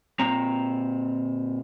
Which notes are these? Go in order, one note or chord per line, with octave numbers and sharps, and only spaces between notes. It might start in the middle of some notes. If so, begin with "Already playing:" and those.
A#2 C4 A#5